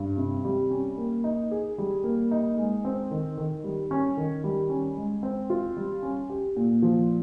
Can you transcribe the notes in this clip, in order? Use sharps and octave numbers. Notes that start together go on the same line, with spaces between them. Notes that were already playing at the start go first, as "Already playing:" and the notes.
Already playing: G2
C3
G3
C#4
A#3
D#4
G#4
G3
A#3
D#4
G#3
C4
D#3
D#3
G3
C#4
D#3
G3
C#4
G#3
C4
F4
G3
C#4
G4
A#2
F3